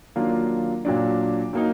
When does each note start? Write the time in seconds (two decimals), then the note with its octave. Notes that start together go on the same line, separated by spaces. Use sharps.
0.16 D#3 F#3 A#3 D4 F4
0.85 A#2 F#3 D4
1.53 F#3 A#3 D#4